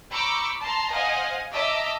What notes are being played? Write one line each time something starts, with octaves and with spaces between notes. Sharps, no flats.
A#5 B5 C#6 D6 E6 G6
A5 A#5 C6
C5 D#5 F5 F#5 G#5
D#5 E5 A5 A#5 D6